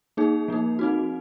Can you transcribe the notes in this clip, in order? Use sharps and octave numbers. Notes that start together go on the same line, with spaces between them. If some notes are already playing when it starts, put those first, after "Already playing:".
A#3 D#4 G#4
F3 A#3 D#4
C4 D#4 F#4